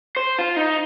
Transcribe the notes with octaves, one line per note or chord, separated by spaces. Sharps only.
C5
F4
D#4